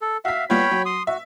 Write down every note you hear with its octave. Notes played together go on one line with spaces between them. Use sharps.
A4
F#4 E5 F5 B6
G3 B3 F4 C#5 G5 B5
F#3
C6 D#6
F#4 E5